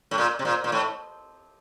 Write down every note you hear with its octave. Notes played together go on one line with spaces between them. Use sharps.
A2
A#2
C3
A#2
A#2
A2